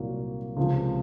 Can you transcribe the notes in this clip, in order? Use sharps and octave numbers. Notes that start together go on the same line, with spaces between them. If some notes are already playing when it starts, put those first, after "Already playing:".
Already playing: C2 A#2 F#3 A#3
C#2 C3 F3